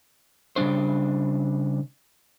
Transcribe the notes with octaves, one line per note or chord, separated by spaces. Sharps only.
C#3 G3 G#3 D4 C5